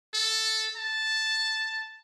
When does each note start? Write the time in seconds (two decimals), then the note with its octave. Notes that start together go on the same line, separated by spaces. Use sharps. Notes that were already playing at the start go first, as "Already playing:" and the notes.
0.14 A4
0.76 A5